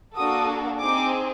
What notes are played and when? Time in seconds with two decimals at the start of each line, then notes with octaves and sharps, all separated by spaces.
0.16 A#3 D4 F#4 A4 D#6
0.80 C4 D#4 G#4 D6